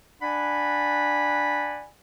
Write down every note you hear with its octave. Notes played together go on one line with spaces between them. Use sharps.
D4 D5 F#5 G#5 B5